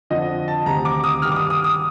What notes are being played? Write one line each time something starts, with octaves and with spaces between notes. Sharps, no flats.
F2 D3 F3 D#5
A5
D2 C3 D#3 A#5
D6
D#6
G2 D#3 F6
D6
D#6
D#6
D#6